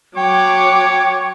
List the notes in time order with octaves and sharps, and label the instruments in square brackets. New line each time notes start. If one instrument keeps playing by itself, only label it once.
[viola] F#3 D6 [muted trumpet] C#5 [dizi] G5